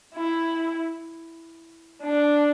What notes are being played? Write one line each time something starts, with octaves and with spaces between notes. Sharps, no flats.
E4
D4